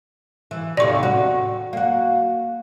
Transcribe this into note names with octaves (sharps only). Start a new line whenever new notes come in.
E3
D#2 A2 C3 D5 C#6
F#4
A#3 F#4